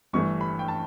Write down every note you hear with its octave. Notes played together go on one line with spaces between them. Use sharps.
G1 G2 E3 A3 C#6
B5
G5
A5